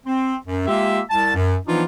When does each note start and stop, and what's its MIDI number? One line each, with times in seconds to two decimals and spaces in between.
0.06 0.35 60
0.46 0.65 42
0.67 1.00 56
0.67 1.00 58
0.67 1.00 65
0.67 1.00 67
0.67 1.00 76
1.09 1.35 36
1.09 1.35 81
1.35 1.55 42
1.67 1.83 52
1.67 1.83 53
1.67 1.83 59
1.67 1.83 62
1.67 1.83 63
1.67 1.83 65